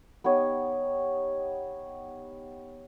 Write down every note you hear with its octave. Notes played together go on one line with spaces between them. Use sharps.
B3 D#4 G4 C#5